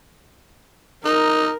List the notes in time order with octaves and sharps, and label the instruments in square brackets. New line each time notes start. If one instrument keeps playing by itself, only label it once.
[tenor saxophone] D#4 [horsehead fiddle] A#4